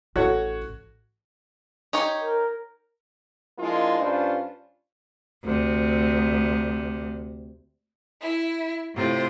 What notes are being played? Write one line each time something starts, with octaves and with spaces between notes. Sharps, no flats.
A1 F#4 A4 C#5 F#5
D#4 G4 C#5
A#4
F3 G#3 A#3 D4 E4 F4
G2 C#4 D4 F4 B4 C5
D2 C3
E4
A2 C3 F4